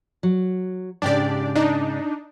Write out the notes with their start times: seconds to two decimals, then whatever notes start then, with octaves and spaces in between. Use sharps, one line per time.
0.23 F#3
1.02 G#2 C#3 D4 G4 D5
1.55 D4 D#4